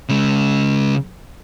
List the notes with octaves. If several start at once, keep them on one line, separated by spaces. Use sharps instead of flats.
C#3 G#3